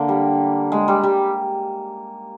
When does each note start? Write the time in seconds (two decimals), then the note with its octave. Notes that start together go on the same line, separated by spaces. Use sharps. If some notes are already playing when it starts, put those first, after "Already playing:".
Already playing: D3 A#3
0.09 G3
0.72 G#3
0.88 G3
1.03 G3